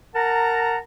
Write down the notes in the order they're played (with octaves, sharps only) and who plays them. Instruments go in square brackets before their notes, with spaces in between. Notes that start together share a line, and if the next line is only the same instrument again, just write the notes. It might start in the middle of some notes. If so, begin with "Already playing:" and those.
[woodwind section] A#4 F#5 A5 A#5